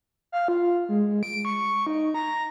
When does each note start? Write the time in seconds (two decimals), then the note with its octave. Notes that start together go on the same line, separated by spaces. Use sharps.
0.32 F5
0.48 F4
0.89 G#3
1.23 D7
1.45 C#6
1.87 D#4
2.14 A#5